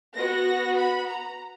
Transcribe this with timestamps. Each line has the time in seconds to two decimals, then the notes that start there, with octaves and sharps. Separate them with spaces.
0.15 B3 F#4 A#6
0.76 B5
1.08 A#5